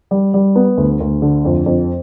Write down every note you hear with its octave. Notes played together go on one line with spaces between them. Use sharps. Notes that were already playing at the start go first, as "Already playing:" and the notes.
G3
G3
B3
D2
D2
D3
F2
F2